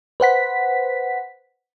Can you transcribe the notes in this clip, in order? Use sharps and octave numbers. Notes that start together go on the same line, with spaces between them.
B4 C5 F#5 B6